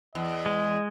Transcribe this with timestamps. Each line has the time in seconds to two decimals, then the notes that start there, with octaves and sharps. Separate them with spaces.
0.15 E2 D#5
0.46 G#3